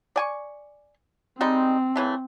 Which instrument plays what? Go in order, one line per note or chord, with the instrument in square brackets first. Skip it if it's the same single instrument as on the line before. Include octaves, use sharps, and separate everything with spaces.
[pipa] D5 G#5 C#6
[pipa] G3 G#3 D#4 [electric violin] C4
[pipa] C#3 E3 A3